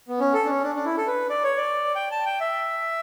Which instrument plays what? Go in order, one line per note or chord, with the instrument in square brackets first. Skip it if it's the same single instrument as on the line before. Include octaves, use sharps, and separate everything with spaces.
[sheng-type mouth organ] B3
C#4
A4
D4
C#4
D4
D4
E4
A4
B4
D5
C#5
D5
G5
A5
G5
E5